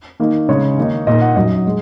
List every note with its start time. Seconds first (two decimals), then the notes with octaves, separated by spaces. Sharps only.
0.20 D#3 A#3 D#4
0.49 C#3 G#3 D#4 C#5
0.78 D#3 A#3 D#4
1.07 A#2 A#3 D#4 D#5
1.21 F#5
1.36 F#2 F#3 D#4 D#5
1.67 G#3